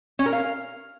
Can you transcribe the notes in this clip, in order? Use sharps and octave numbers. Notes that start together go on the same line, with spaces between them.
C#4
A#4
F5